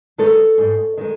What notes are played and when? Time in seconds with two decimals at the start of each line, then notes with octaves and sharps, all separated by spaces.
0.18 D#3 G#3 A4 C#5
0.58 G#2
0.97 D#3 G#3